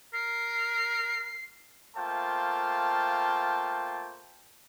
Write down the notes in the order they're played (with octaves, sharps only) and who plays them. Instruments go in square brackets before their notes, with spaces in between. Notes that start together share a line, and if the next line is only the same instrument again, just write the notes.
[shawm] A#4 [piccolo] C7
[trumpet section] A3 A#3 F4 C5 G5 A5